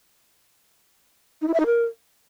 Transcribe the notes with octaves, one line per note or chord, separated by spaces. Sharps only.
D#4
E4
E5
D#4
A#4